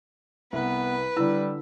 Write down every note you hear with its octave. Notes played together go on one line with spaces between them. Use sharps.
C2 B3 B4
D3 G3 E4 E6